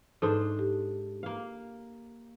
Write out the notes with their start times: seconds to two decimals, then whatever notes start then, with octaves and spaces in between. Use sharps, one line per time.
0.22 G#2 D4 A4 C5
0.59 G4
1.23 A#3 F5